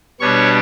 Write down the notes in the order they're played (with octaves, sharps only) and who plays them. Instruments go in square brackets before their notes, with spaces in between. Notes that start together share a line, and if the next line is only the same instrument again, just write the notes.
[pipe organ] B2 G3 B3 D4 C#5 C#6